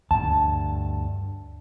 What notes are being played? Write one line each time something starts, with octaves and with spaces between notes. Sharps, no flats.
D2 G2 A5